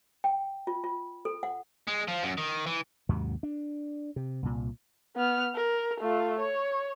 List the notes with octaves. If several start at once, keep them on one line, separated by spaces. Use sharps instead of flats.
G5
F4
F4
A4
F#5
G#3
F3
F#2
D#3
E3
D#2 G#2 C3 F#3
D4
C3
C2 A#2
B3 F6
A#4
A3 F4
C#5